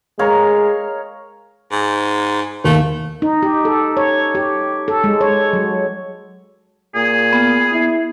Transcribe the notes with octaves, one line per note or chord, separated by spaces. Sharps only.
G#3 A#4 C#5 F5
G#2
D#2 A3
D#4
G4
A4
C#5
G4
A4
G#3
C#5
F#3
A#2 G#4
B3
E4